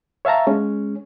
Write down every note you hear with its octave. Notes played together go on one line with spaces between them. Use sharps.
C#5 E5 F5 A5 A#5
G#3 C#4